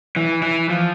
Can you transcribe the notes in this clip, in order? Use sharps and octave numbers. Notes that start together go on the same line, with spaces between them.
E3
E3
F3